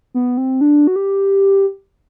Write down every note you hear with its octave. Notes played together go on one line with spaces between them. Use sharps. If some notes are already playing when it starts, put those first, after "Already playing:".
B3
C4
D4
F#4
G4